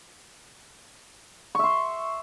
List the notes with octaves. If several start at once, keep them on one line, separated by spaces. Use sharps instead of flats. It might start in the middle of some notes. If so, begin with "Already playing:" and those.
E5 C6 C#6